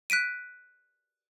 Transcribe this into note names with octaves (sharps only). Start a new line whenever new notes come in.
F#6 B6 D7 D#7